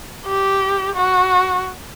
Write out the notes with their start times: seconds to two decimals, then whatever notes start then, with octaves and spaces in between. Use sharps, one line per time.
0.26 G4
0.95 F#4